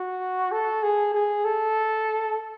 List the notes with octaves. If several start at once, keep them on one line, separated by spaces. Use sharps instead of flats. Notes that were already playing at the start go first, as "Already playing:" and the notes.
Already playing: F#4
A4
G#4
G#4
A4